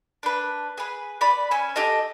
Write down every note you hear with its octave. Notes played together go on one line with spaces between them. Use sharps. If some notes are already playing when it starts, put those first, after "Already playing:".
D4 B4
G#4 B4
B4 D5 B5
C#4 G#5 E6
G4 A4 D#5